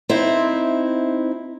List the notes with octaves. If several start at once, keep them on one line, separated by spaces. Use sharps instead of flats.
C4 D#4 E4